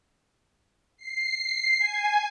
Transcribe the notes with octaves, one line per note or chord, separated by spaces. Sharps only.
C7
G#5